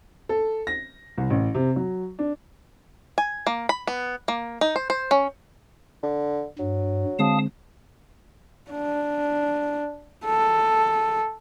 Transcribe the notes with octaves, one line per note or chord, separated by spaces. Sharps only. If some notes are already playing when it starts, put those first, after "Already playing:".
A4
A#6
C2
A1
C3
F#3
D4
G#5
A#3
B5
B3
A#3
D#4
C5
C5
C#4
D3
G2 F#3
D3 G#3 C4 F5 A5 D#6
D4
A4